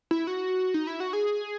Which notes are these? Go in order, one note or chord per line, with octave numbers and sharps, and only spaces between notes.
E4
F#4
D#4
E4
F#4
G#4